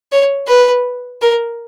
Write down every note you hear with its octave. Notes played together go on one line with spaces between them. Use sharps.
C#5
B4
A#4